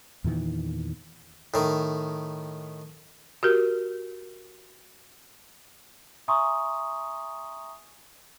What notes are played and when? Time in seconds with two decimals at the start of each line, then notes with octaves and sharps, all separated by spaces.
0.24 E2 A#2 D#3 E3
1.54 A2 D#3
3.43 F#4 G4 A#4
6.28 E5 G#5 A#5 C6 C#6 D#6